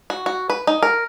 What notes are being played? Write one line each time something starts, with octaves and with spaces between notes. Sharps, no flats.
F#4
F#4
B4
D#4
A#4